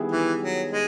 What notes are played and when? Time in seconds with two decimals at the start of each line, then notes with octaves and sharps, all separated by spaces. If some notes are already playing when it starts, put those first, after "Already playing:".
Already playing: D#3 G3 B3 E4 G#4
0.12 E3
0.41 F#3
0.71 G#3